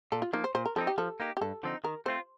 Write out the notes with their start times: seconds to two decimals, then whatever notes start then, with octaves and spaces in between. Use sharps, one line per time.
0.12 A#2 A4
0.22 F4
0.33 F3 A#3 D#4
0.44 C5
0.55 A#2 C5
0.66 A#4
0.76 F3 C4 D#4 A4
0.87 G4
0.98 F3 A4
1.20 A#3 D#4 G4
1.37 G4
1.41 G2 A4
1.63 D3 F3 C4 D#4
1.84 D#3 A#4
2.06 A3 C4 F4 C5